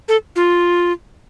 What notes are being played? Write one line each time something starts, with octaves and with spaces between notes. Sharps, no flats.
A4
F4